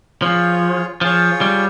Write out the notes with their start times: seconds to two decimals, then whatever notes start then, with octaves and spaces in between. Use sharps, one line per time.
0.22 F3 F4 G#4 C#5
1.01 F3 F4 G#4 C#5
1.41 G3